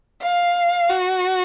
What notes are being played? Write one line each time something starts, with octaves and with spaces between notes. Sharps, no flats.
F5
F#4